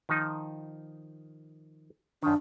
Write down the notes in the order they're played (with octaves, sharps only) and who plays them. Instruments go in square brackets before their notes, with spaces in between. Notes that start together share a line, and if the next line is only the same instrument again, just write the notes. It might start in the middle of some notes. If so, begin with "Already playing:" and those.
[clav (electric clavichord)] D#3 F3 D#4
[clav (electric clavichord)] F#2 D#3 [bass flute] D4